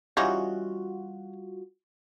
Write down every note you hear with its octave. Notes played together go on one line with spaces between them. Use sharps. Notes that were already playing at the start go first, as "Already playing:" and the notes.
E3 G3 C#4 D#4 F4 F#4